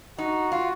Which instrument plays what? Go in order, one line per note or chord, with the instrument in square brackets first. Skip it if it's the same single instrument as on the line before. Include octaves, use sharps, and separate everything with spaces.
[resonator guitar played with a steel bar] D#4 [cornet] F#4
[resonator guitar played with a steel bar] F4